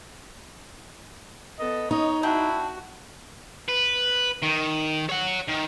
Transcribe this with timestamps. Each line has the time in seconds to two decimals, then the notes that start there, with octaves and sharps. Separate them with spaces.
1.59 B3 A4 D#5
1.91 D#4 C#5 D#5
2.23 D4 E4 F#4 G5
3.69 B4
4.43 D#3
5.10 C#5 F#5
5.49 D#3